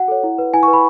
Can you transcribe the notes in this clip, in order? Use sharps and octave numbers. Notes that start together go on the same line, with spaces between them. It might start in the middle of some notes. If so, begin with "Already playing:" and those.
Already playing: F#4 F#5
A4 C#5
E4
B4
E4 G#5
C#6
B4
B5